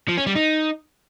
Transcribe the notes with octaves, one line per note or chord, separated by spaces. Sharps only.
F3
C#4
G3
D#4